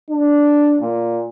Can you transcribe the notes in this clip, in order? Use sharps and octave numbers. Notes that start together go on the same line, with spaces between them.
D4
A#2